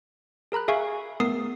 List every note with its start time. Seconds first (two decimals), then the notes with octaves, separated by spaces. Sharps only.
0.52 G#4 A#4 A#5 B5 F#6
0.68 G#4 E5 F5 G#5 C#6
1.20 A3 B3 A#4 D#6 C7